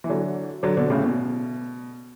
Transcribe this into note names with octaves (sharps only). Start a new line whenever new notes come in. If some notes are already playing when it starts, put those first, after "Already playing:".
E3
D3 F#3
D3 F#3
B2 D3
A2 C#3
B2